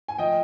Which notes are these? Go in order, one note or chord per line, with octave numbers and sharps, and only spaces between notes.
G#5
F3 D#5 G5